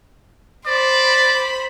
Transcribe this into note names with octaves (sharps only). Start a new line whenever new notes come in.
C5 D5 B5